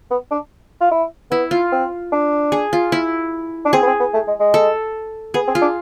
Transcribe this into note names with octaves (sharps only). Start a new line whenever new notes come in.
B3
D4
F4
E4
B3 E4
F4
C4
D4
G#4
F4
E4
D4
C4 G#4
B3
C4
B3
A3
G#3
G#3
A4
B3 G#4
C4
F4
D4